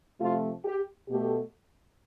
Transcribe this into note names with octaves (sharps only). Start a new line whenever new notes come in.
C3 F3 A3 F4
G4
B2 A3 G4